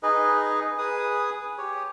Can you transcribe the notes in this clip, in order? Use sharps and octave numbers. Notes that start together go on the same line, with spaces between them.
D#4 G#4 B4 D#5
G#4 B4 D#6
G4 C#5